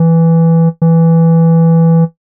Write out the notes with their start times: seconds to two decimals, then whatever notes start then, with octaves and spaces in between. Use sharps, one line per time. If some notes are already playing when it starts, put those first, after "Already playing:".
Already playing: E3
0.82 E3